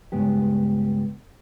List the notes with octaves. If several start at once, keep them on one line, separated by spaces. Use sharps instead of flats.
C#2 G2 G#3 B3 G4